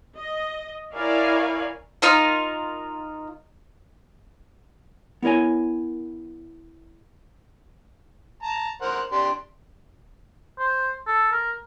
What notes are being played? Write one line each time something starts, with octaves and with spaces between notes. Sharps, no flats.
D#5
E4 A#4 C#5 D5 F5 G#5
D#4 F4 A#4
B3 E4 A#4 C#5 G#5
A5 A#5
A#4 C5 F#5
D4 G4 C6
C5
A4
A#4